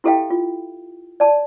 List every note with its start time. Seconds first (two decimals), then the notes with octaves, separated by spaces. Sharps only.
0.04 E4 G4 A4 E5 F5 G5
0.30 F4
1.20 D5 A5